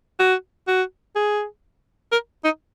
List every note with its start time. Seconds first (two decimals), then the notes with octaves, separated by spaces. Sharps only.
0.20 F#4
0.68 F#4
1.16 G#4
2.12 A#4
2.44 D#4